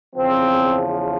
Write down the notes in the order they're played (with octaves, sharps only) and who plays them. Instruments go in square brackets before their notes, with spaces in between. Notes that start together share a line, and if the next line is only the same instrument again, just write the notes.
[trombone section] E2 C#3 F3 C4